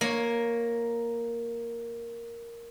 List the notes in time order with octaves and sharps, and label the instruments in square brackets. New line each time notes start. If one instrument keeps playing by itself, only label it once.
[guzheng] A#3 C#5